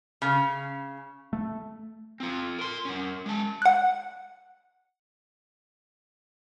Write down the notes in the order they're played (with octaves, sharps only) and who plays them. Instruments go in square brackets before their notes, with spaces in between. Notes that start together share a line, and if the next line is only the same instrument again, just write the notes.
[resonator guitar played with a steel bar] C#3
[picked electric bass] A3
[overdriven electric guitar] C4 F4
A#4 C6
C#4 A#4
G#3 A5
[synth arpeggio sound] F#5 F#6